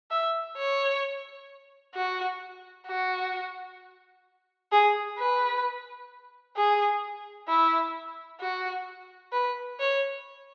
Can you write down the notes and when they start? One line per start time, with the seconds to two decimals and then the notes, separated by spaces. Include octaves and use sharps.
0.11 E5
0.57 C#5
1.95 F#4
2.87 F#4
4.72 G#4
5.19 B4
6.57 G#4
7.48 E4
8.41 F#4
9.33 B4
9.80 C#5